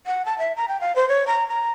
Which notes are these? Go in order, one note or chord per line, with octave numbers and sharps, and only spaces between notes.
F#5
A5
E5
A#5
G5
F5
C5
C#5
A#5
A#5